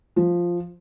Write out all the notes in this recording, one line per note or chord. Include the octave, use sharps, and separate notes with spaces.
F3